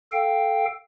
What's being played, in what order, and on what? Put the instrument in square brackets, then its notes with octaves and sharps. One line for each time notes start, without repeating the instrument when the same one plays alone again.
[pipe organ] A4 F5 G5